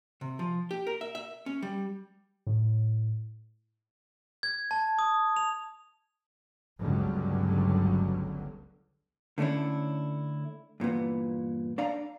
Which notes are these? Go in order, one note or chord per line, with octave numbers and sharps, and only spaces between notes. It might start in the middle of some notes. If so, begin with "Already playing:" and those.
C3
F3
G4
A#4
E5
E5
C#4
G3
A2
G#6
A5
D#6
F7
G1 C#2 G2 D3 F#3 G3
D3 A3 C#4 D4 E4
G2 A#2 E3 B3
D4 D5 F5 A#5